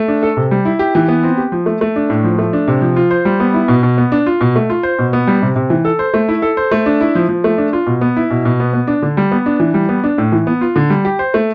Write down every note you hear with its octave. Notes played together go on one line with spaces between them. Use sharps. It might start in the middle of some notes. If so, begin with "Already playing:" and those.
Already playing: A3
D4
A4
C3
G3
E4
G4
E3
B3
C4
G4
F3
A3
A3
D4
A2
F3
A3
D4
C3
F3
F4
C5
G3
B3
E4
B2
B2
B3
D4
F4
B2
A3
F4
C5
B2
B3
G3
C3
C3
E3
A4
C5
A3
E4
A4
C5
A3
D4
E4
F3
F3
A3
D4
F4
B2
B3
E4
B2
B2
B3
B3
D4
D3
G3
B3
D4
E3
G3
B3
D4
A2
E3
B3
F4
D3
G3
G4
C5
A3